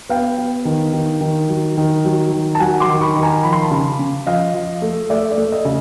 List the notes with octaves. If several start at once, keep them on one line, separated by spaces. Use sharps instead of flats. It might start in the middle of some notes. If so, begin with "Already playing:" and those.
B3 F5 G5
B3
D#3
D#3
D#3
F#3
D#3
F#3
D#3
A5
F#3 F#5 G#5
C6 D6
D#3
B5 C#6
D#3
G#5 A#5
F3 B5
C6
A5 B5
C#3
C#3
F3 D#5 F5
F3
A3
A3 D5 E5
D5
A3
D#5
C#3